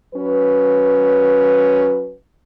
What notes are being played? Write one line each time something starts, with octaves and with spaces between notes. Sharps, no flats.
F#3 C#4 B4